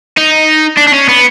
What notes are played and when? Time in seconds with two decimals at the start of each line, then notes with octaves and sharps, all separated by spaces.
0.18 D#4
0.77 D4
0.88 D4
0.94 C#4
1.09 B3